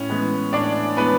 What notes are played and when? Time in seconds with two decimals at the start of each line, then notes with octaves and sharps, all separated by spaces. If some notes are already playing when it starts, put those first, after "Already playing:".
Already playing: A2 C#4
0.09 E3 G#3 B3
0.53 A2 D4 D5
0.97 E3 G#3 B3 B4